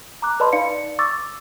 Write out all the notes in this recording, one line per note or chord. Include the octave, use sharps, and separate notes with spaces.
A#5 D6 F#6
B4 D5 D#5 A5 B5 C6
D#4 D5 F5 C#7
C#6 D6 E6 A6